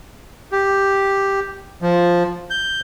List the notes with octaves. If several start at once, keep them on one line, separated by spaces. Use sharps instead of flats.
G4
F3
G6